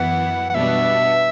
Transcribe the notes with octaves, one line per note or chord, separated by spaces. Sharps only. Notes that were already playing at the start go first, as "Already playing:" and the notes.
Already playing: F#2 E3 B3 E4 F#5
F#5
B2 G3 B3 D4 E5